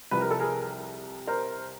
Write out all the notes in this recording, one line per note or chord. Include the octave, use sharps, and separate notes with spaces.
C2 C3 F3 B4
A#4
A4
G#4 A#4
A#4 C5